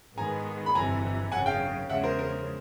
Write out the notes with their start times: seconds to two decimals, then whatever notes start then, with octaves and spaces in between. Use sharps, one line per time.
0.18 G#2 D#3 G#3 B3 G#5 A#5
0.66 B5
0.75 G1 F2 C3 E3 G#5 A#5
1.32 G#1 F#2 C#3 F#5 G#5
1.46 F5 G5
1.89 E2 C#3 F3 G#3 E5 F#5
2.03 A#4 C5
2.19 A#4